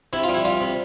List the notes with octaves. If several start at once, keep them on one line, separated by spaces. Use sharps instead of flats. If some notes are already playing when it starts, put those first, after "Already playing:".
C3 E4
F4
G3 E4
G3 F4
C3